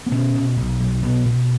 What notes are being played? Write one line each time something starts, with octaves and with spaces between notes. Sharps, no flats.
B3
B2 C#4
B2
B1
B1
B2 B3
B2